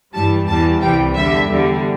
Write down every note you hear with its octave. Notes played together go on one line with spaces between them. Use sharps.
G2 E3 G3 A5
E2 E3 G3 A5
C2 C3 E3 G3 G5
E2 D3 G3 E5
E2 D3 G3